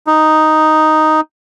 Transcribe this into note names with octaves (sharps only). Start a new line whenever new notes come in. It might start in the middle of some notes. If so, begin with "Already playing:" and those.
D#4